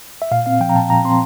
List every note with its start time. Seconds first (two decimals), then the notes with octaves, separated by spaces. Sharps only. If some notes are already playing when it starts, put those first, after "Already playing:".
0.22 E5
0.31 A#2 F5
0.46 C4 F5
0.60 F3 G5
0.69 A#5
0.75 A#2 A5
0.90 A#2 A#5
1.05 C4 C6